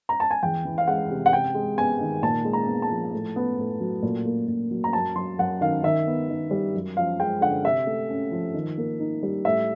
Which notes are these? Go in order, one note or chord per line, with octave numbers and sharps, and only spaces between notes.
A#5
A5
G#5
E2 G5
E3
F5
G#3 F#5
C3
F#5
C3 G5
G#3
B3 G#5
D#3
A#2 A5
G#3
A#5
B3
A5
F3
A2
B3
A2
F#3
A#2
A#3
A#2
F#3
A#5
F#2 A5
F#3 C6
F#2 F#5
D#3 F5
D#3 E5
B3
D#3
G3
F#2
F3 F5
G#3 G5
D3 F#5
C3 E5
A3
C#4
F3
D#3
A#3
D#4
G3
A2 E5